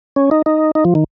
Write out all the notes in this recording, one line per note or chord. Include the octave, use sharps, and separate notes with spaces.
C#4
D#4
D#4
D#4
F3
D#3